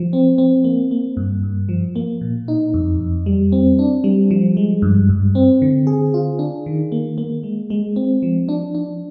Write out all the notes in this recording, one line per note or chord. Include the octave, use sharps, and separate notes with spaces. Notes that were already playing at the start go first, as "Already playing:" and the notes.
Already playing: F3
C4
C4
A#3
A#3
G2
G2
F3
A#3
A#2
D#4
F2
F2
G3
C4
D4
G3
F3
G#3
G2
G2
C4
D3
G#4
F4
D4
D#3
A#3
A#3
G#3
G#3
C4
F3
D4
D4